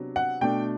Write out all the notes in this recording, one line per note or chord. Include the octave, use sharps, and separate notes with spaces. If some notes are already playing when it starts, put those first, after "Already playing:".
Already playing: C3 F#3 B3 D4
F#5
B2 A3 D4 G5